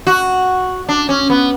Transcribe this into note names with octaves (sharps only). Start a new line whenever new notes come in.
F#4
D4
C#4
B3